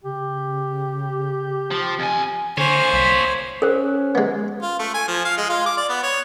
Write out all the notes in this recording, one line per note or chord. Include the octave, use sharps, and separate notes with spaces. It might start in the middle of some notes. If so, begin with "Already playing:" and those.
C#3 G4
F3
F2 G#5
D3 A#3 C5 C#5 G#5
C2 B6
C#4 A#4 C5
G#3 B3
F4
A3
G#5
F3
F5
G#3
F4
D6
D5
B3
C#5